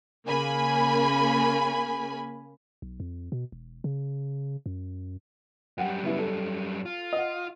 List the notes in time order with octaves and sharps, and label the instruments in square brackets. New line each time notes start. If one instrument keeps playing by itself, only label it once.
[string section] C#3 A#3 G#5 B5
[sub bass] B1
F2
B2
E1
C#3
F#2
[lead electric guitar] F#2 G3 [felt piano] F#5 G5
[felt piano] C#3 B3 E4
A4
[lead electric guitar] F4
[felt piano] D#5 F#5